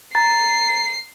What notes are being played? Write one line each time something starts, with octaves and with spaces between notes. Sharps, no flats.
A#5 A6 C7